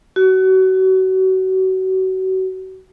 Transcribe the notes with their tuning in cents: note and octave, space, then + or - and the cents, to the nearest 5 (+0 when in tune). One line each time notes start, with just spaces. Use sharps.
F#4 +30